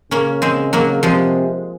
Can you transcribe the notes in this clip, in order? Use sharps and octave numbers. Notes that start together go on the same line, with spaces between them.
C#3 A#3 C#4
G#3 C4
F#3 A#3
C3 F3 G#3